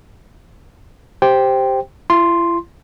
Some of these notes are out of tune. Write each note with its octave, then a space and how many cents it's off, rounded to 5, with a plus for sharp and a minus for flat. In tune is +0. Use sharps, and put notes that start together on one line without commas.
G4 +0 C5 +0 G5 +0
E4 +45 C6 +0